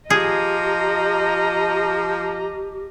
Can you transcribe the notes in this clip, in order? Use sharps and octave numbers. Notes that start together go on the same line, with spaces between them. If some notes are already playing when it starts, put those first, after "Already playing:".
F3 G4 G#4 D#5 A#5